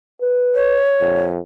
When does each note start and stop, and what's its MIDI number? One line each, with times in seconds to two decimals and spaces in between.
0.22 0.80 71
0.55 1.24 73
1.01 1.39 41